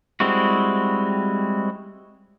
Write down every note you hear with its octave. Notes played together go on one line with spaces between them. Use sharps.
G3 G#3 C4 E4 F#4